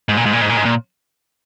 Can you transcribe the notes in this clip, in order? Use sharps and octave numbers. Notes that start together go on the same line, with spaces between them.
G#2
A#2
G#2
A#2
G#2
A#2
G#2
A#2